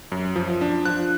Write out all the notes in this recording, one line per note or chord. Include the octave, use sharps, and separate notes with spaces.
F#2
F3
D4
F3 F#6